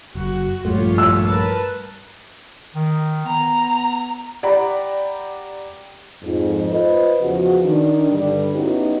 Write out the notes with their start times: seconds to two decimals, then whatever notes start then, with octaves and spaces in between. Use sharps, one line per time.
0.15 F#1 F#4
0.65 A#1 G2 A3 F4 G4 C#5
0.98 E6
1.28 A#4 B4 A5
2.75 D#3
3.25 B3 A#5
4.43 G4 D5 F#5 G5 A#5 B5
6.23 F2 G#2
6.71 F4 B4 C5 D#5
7.21 E2 C#3 F3 F#4
7.65 D#3 D4
8.10 G2 D3 G3
8.53 B3 C#4 D#4 E4 F#4 G4